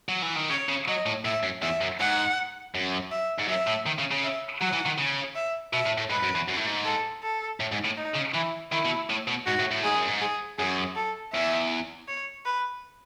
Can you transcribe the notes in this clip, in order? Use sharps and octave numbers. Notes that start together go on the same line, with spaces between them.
F#3
E3
D#3
C#3 C#5
C#3
F#3 D#5
A2
A2 E5
F#2
E2 E5
F#2
G#2 F#5
F#2
E5
G#2
F#2 E5
A2
D#3
C#3
C#3
E5
F#3 F#5
E3
D#3
C#3
E5
B2 E5
A2
A2
G#2 B4
F#2
E2
F#2
A2
G#2
A4
A4
A2
G#2
A2
D#4
C#3
E3 E4
D#3 E4
B2
A2
B2
G#2 F#4
A2
A2
G#2 G#4
F#2
G#2
G#4
F#2 G#4
A4
E2 E5
C#5
B4